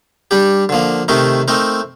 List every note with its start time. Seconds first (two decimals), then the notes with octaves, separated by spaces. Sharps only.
0.31 G3 D4 G4
0.69 D3 F3 A#3
1.08 C3 D#3 A3 D#4 A#4
1.48 A3 C4 D#4 A#4